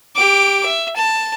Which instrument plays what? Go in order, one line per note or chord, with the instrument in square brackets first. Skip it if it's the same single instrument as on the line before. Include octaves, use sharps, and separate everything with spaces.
[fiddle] G4 D6
E5
A5